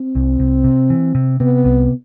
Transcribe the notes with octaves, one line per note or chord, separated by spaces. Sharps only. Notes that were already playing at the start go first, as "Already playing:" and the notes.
Already playing: C4
C2
C2
C3
E3
C3
C3 B3
C2